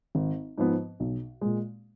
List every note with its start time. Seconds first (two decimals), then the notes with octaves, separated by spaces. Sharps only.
0.15 G#1
0.58 G#2 F3 B3
1.00 B1
1.41 A#2 G#3